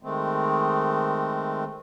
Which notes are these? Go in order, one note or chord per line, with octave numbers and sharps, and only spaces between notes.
D#3 G#3 A3 C4